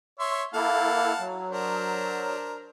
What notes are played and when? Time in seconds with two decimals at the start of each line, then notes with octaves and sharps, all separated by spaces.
0.20 C#5 E5 C6
0.54 A#3 E4 A4 F5 F#5 A5
1.20 F#3
1.50 D4 A#4 C5